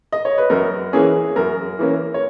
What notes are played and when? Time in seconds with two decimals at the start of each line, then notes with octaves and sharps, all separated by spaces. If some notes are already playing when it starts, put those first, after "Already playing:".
0.12 D#5
0.25 C#5
0.38 B4
0.50 F#2 A#4
0.93 E3 A#3 C#4 G#4
1.36 F#2 A#4
1.79 E3 A#3 C#4
2.14 C#5